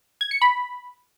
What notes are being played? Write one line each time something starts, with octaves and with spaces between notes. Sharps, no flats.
G#6
C#7
B5